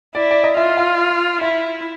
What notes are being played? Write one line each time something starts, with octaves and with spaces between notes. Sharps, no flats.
E4 D5
D5
D#5
F4 E5
F5
E4 E5